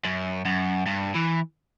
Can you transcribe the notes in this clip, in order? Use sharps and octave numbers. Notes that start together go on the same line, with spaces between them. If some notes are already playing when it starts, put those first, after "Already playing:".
F#2
F#2
G2
E3